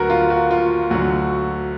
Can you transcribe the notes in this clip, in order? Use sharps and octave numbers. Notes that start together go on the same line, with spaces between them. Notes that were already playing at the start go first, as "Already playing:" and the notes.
Already playing: D2 D3 F#3 F#4 A#4 B4
F4
F#4
F4
D2 D3 F#3 F#4